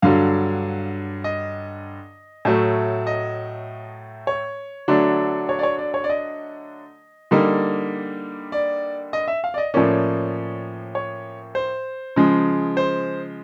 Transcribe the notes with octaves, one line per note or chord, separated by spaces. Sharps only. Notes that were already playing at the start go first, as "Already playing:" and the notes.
G2 D3 F#3 F5
D#5
A2 F#3 A3
D#5
C#5
D3 F#3 A3 D4
C#5
D5
C#5
D5
C#5
D5
D#5
D3 G3 A#3 D#4
D5
D#5
E5
F5
D5
D#5
A2 F3 A#3 C#4 D5
C#5
C5
C#3 F3 G#3
C5